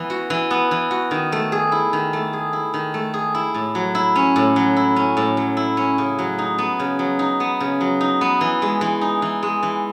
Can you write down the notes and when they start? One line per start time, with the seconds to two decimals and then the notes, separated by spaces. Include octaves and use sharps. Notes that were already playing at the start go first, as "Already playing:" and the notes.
Already playing: E3 B3
0.10 F#4
0.30 E3
0.51 B3
0.71 E3
0.91 F#4
1.11 D#3
1.32 A3
1.52 G#4
1.72 E4
1.93 D#3
2.13 A3
2.33 G#4
2.53 E4
2.74 D#3
2.94 A3
3.14 G#4
3.34 E4
3.55 A2
3.75 F#3
3.95 E4
4.16 C#4
4.36 A2
4.56 F#3
4.77 E4
4.96 C#4
5.17 A2
5.37 F#3
5.57 E4
5.77 C#4
5.98 C#3
6.19 F#3
6.39 D#4
6.58 B3
6.80 C#3
6.99 F#3
7.19 D#4
7.40 B3
7.60 C#3
7.81 F#3
8.01 D#4
8.21 B3
8.41 E3
8.62 G#3
8.81 E3
9.01 D#4
9.22 E3
9.43 G#3
9.63 E3